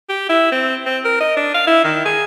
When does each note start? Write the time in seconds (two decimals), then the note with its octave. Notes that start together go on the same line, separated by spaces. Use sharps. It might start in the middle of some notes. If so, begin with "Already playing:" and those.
0.09 G4
0.29 E4
0.52 C4
0.86 C4
1.05 A#4
1.20 D#5
1.37 D4
1.54 F5
1.67 E4
1.84 D#3
2.06 G#4